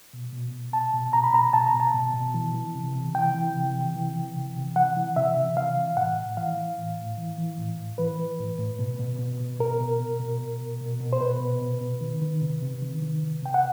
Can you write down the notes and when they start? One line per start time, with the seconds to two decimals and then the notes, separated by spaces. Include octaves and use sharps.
0.13 B2
0.33 B2
0.53 B2
0.73 B2 A5
0.93 B2
1.13 B2 A#5
1.24 B5
1.33 B2 A#5
1.53 B2 A5
1.66 A#5
1.74 B2
1.80 A5
1.94 B2
2.14 B2
2.34 E3
2.55 E3
2.75 C3
2.96 C3
3.15 E3 G5
3.35 E3
3.55 C3
3.75 C3
3.96 E3
4.16 E3
4.35 C3
4.56 C3
4.76 E3 F#5
4.97 E3
5.16 C3 E5
5.36 C3
5.57 E3 F5
5.77 E3
5.97 A2 F#5
6.18 A2
6.37 E3 F5
6.57 E3
6.78 A2
6.98 A2
7.17 E3
7.38 E3
7.58 A2
7.79 A2
7.98 E3 B4
8.19 E3
8.39 A2
8.58 A2
8.79 B2
8.99 B2
9.19 B2
9.40 B2
9.59 B2 A#4
9.80 B2
10.00 B2
10.20 B2
10.41 B2
10.61 B2
10.81 B2
11.01 B2
11.13 C5
11.21 B2 B4
11.41 B2
11.61 B2
11.81 B2
12.01 D#3
12.21 D#3
12.42 C3
12.62 C3
12.82 D#3
13.02 D#3
13.23 C3
13.43 C3 G5
13.54 F#5